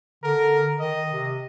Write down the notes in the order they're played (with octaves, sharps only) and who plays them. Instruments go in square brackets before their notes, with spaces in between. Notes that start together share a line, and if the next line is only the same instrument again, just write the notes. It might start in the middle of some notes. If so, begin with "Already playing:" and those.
[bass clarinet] D3 [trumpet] A#4
[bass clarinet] D#3 [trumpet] D#5
[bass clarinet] C3